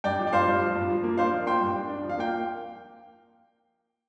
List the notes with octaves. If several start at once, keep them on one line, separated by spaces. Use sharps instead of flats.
G2 D5 G5
F3
D5
G2 C5 F5
G2
F3
G2
F3
A#3
D4 C5 F5
F3
A#3 G5 C6
G2
D4
D4
F3
F5
A#3 G5